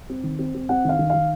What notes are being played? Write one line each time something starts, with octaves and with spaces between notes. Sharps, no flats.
C4
D#3
C4
C4
C4 F#5
D#3 F5
D#3
D#3 F5